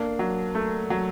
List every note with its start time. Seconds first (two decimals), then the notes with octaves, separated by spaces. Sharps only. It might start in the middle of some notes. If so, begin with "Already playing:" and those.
Already playing: A#3 D4
0.19 F#3
0.55 A3
0.90 F#3